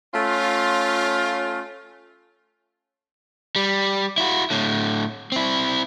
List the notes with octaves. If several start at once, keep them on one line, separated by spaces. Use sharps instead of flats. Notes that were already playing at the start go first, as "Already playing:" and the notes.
A3 C#4 F4
G3
E4 F#4
A2 D3
C4 E4